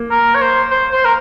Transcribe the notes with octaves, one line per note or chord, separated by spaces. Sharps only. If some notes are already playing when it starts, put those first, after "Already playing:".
Already playing: A#3
A#4
C#5
C5
C5
C5
A#4